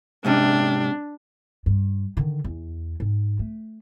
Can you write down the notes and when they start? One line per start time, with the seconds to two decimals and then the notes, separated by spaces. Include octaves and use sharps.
0.25 G#2 C3 C#4 D4
1.66 G2
2.17 D3 D#3
2.44 E2
3.00 G#2
3.39 A3